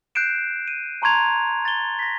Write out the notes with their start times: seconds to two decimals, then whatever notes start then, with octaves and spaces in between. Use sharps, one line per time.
0.15 F#6 G6 C7 D7 E7
0.68 D#7
1.02 A5 A#5 C6 C#6 G#6 F7
1.65 A6 G7
1.99 A#6 B6